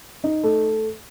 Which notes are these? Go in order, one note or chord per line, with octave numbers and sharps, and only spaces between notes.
D#4
A3